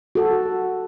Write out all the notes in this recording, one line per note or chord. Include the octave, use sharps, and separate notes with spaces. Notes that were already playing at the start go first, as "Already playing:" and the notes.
F#4 A4